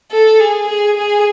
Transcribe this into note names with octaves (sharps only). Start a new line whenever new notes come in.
A4
G#4
G#4
G#4